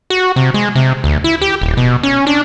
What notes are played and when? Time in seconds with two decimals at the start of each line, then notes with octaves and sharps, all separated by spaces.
0.10 F#4
0.36 C3
0.54 G#3
0.76 C3
1.04 D2
1.24 E4
1.41 G4
1.62 D#1
1.77 B2
2.03 C#4
2.27 D4